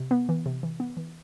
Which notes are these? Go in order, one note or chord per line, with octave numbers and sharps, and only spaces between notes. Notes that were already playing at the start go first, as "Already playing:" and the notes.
Already playing: C3
B3
E3
C3
E3
B3
E3